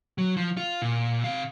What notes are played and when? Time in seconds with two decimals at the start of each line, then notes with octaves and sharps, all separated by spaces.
0.18 F#3
0.37 F3
0.57 F4
0.82 A#2
1.24 C3 F5